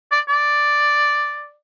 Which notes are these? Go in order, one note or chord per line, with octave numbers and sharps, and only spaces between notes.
D5
D5